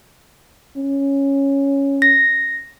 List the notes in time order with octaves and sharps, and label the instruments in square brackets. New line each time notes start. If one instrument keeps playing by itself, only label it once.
[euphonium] C#4
[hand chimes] A#6